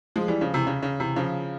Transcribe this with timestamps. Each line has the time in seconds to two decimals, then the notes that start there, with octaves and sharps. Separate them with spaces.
0.16 F3 G#3
0.28 E3 G3
0.41 C#3 F3
0.54 C3 E3
0.67 C#3
0.82 C#3
1.00 C3 E3
1.16 C#3 F3